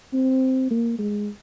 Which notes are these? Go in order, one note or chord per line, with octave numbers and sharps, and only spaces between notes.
C4
A#3
G#3